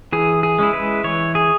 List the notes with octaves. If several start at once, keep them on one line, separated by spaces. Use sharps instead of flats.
E3 G#4
G#4
G#3 C#4 E4
B4
E3 C#5
G#4